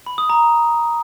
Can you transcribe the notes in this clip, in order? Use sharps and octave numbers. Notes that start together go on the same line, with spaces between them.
B5
D#6
A#5